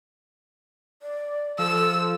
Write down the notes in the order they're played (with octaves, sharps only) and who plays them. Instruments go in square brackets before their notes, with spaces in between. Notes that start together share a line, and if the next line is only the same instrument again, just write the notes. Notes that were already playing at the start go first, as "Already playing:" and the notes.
[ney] D5
[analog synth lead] F3 [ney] A4 [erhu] E6